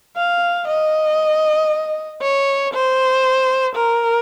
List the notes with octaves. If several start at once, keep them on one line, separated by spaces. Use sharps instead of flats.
F5
D#5
C#5
C5
A#4